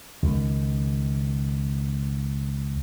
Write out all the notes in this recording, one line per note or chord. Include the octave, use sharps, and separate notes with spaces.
C#2 D#3